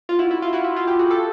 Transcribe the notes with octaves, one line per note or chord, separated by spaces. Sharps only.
F4
E4 F#4
E4
F4
E4 F#4
E4
F4
F4 G4
F#4 G#4
G4 A4